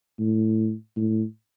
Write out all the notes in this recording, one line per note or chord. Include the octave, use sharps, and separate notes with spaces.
A2
A2